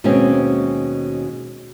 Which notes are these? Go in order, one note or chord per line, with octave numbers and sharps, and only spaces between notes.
D#2 B2 G#3 C4 C#4